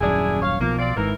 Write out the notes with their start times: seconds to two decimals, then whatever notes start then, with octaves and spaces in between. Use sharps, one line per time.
0.01 D#1 F#2 D4 E4 G#4
0.42 C#5 F5
0.60 B1 B2 F3 A#3
0.79 C4 F4 D5
0.96 G#1 G#2 E3 A#4